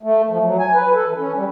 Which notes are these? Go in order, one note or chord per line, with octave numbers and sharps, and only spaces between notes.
A3
F3
F#3
G#5
B4
A4
E3
C#4
G3